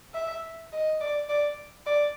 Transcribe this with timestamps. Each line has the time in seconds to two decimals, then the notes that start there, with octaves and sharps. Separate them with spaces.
0.14 E5
0.72 D#5
1.01 D5
1.29 D5
1.86 D5